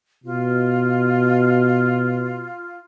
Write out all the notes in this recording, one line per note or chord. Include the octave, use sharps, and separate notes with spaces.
B2 F4